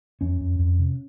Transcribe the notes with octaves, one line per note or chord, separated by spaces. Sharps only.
F2 C#4
F2
F2
C3